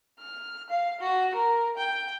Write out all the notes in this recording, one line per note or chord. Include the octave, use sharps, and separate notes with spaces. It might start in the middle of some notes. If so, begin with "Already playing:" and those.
F6
F5
F#4
A#4
G5